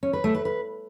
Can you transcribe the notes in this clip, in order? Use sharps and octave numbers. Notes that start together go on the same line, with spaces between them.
C#4
B4
A3
B4
B4